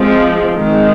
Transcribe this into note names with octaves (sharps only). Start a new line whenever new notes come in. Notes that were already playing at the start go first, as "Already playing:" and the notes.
Already playing: F3 G#3 C4
D#3 G#3 C4